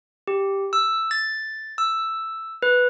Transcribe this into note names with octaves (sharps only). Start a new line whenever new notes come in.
G4
E6
A6
E6
B4